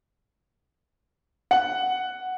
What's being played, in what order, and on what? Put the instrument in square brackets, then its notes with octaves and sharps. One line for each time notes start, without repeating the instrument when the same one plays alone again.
[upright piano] F#5